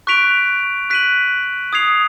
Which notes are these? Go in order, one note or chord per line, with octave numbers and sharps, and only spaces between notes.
C#6 F#6 B6 D7 F7
F#6 B6 D#7 F#7
D#6 G#6 C7 F7